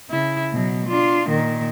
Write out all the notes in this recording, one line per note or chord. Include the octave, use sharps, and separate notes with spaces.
C#3 E4
B2 F#3
D4 F4
A#2 D#3